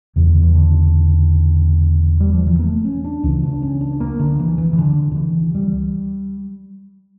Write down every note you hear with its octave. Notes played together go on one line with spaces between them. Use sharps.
E1 E2 C#3 E3
D3
E3
D3
G3
F3
E3
A#3
A3
C#4
D4
C#2 C#3 E3
D4
C#4
D4
A#3
D3
E3
E3
E3
D3
D3
E3
G3